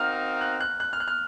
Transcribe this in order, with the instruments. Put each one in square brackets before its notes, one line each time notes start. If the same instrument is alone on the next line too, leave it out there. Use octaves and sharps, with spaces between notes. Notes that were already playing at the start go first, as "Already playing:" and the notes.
Already playing: [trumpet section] C4 D#4 F#4 A#4 F5 [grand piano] F6
[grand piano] F#6
F#6
F#6
F6
F#6
F6